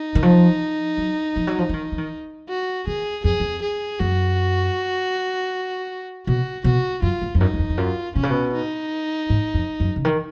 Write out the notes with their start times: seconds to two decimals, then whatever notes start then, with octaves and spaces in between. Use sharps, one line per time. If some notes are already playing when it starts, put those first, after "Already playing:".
Already playing: D#4
0.15 D#3
0.23 F3
0.97 F#3
1.36 F3
1.47 F#3
1.58 F3
1.69 F3
1.74 D#3
1.92 F3
1.98 D#3
2.48 F#4
2.87 D#3 G#4
3.24 F2 G#4
3.40 F2
3.62 G#4
4.00 F#2 F#4
6.27 B2 F#4
6.64 B2 F#4
7.02 F#2 F4
7.22 G#2
7.35 F2
7.40 F#2 D#4
7.54 F#2
7.59 F2
7.69 F2
7.77 F#2 F4
8.16 B2 C#4
8.23 C#3
8.30 B2
8.53 D#4
9.30 G#2
9.54 F2
9.80 F#2
9.96 C#3
10.05 D#3